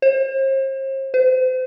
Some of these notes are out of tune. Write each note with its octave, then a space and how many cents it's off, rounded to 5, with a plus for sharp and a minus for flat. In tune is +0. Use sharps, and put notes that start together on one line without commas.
C5 +40
C5 -35